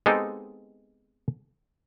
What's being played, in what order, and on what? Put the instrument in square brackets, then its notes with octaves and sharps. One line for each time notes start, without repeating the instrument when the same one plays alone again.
[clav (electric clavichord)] G#3 B3 C4 D#4 G4 A4